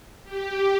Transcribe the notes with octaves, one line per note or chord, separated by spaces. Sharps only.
G4